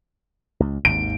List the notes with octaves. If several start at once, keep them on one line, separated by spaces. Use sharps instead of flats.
C#2
G#1 D#2 D7